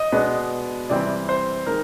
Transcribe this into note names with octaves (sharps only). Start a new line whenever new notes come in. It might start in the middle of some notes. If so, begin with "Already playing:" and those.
Already playing: D#5
B2 G#3 B3 D4
C3 E3 G3 C4 D5
C5
D#3 G#3 A#4